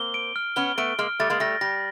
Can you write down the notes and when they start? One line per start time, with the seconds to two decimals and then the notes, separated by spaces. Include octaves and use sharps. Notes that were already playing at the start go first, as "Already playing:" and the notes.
Already playing: A#3 C4 G7
0.14 D7
0.36 F6
0.56 B3 C#4 G7
0.78 A3 B3 D7
0.99 G#3 A#3 F6
1.20 G3 A3 A6
1.30 G#3 A#3
1.40 G3 A3 A#6
1.61 G3 A#6